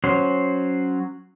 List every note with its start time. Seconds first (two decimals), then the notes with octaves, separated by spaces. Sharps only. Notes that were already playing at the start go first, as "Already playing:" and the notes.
0.04 F#3 C#4 C5